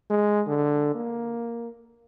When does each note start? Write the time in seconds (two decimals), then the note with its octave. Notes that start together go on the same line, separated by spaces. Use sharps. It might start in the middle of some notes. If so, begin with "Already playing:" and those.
0.10 G#3
0.47 D3
0.95 A#3